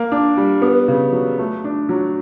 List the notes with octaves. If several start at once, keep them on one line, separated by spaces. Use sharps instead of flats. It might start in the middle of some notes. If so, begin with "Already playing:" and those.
Already playing: A#3
D4
G3
B3
C#3
F#3
A3
D4
F#3